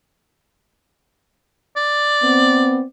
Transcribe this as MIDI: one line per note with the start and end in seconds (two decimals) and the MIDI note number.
1.76 2.83 74
2.23 2.82 59
2.23 2.82 60